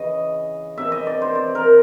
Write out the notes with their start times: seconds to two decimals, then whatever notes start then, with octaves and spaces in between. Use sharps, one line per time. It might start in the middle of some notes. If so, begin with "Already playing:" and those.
Already playing: C#3 E3 D#5
0.78 C3 E3 E5
0.92 D#5
1.07 D5
1.22 C5
1.35 D5
1.55 A#4